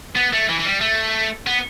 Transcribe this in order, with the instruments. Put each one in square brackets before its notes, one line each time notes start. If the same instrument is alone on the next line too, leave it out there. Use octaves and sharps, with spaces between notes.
[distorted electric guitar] B3
A3
E3
E3
G3
A3
B3